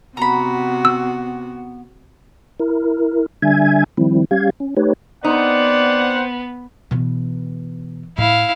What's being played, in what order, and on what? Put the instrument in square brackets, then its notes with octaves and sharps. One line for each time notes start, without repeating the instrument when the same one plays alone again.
[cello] C3 F#4 [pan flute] B3 [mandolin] A#5 B5
[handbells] E6
[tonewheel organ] E4 A#4
D3 G3 D4 E5 G#5 G#6
D#3 F3 G3 C4 E4
G3 C#4 G4 F5 G#6
C#4
A3 D#4 G4 B4 C#5
[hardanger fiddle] B3 [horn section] C4 C5 F#5 [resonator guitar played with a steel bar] D#4 [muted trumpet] D5
[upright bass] B2 E3
[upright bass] A2 [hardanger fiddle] E4 F5